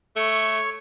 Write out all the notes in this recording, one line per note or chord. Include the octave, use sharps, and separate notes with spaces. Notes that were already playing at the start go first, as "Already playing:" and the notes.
A3 C#5 C#6